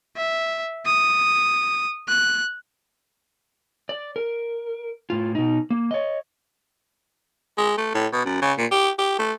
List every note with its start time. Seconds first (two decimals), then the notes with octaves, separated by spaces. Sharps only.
0.17 E5
0.86 D#6
2.08 F#6
3.89 D5
4.16 A#4
5.10 A2 F4
5.35 B2 D#4
5.70 A#3
5.91 C#5 D#5
7.58 G#3
7.78 A3
7.94 A2
8.13 B2
8.26 F#2
8.42 C#3
8.58 A#2
8.71 G4
8.98 G4
9.19 A3